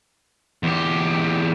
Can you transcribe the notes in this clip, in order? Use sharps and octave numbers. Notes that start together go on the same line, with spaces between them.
E2 G4